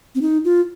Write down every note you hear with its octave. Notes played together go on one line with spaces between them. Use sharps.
C4
D#4
F4